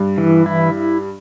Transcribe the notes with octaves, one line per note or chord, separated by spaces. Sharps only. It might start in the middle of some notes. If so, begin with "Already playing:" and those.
Already playing: G2
E3
E4